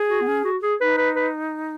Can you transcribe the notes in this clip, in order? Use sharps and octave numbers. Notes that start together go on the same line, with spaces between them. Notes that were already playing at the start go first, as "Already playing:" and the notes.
Already playing: G#4
F#4
B3
C#4
F#4
G#4
D#4 B4
B4
B4